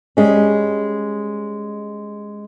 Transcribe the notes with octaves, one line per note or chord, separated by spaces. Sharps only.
G3 G#3 C#4